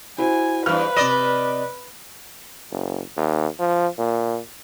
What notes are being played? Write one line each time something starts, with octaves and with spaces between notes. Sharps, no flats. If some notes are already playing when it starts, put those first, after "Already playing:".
E4 F#4 C5 G#5
E2 G2 B4 C5 F5 F6
C3 D5 D#5 E7
F#1
D#2
F3
A#2